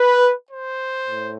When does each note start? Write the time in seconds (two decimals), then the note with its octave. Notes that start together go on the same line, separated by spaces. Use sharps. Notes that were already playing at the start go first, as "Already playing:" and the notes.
Already playing: B4
0.48 C5
1.08 A2